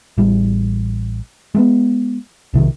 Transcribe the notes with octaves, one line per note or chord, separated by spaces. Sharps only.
A1 G3
G#3 A3 B3
B1 C3 D#3